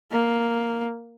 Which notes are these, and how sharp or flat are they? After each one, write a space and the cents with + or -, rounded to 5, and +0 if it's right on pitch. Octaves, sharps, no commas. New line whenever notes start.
A#3 +0